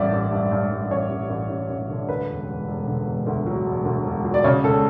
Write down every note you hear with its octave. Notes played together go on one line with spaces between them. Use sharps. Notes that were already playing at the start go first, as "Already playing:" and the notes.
Already playing: A1 G2 D5 E5
A1
G2
G2
G2
A1 C#5
A1
A1
A1
A1
D3
D2 B4
E1
E1
E1
D3
E1
D2
F#3
E1
D2
E1
F#3
D5
C#3 C#5
C#2 A4